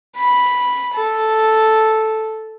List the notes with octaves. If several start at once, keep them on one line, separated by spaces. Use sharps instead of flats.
B5
A4